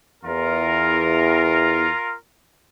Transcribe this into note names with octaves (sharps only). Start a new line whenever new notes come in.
E2 F4 A#4